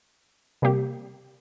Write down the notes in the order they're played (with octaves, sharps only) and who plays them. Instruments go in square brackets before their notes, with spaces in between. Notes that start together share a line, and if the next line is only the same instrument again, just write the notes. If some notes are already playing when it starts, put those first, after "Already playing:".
[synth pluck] C3 G3 A#3 G4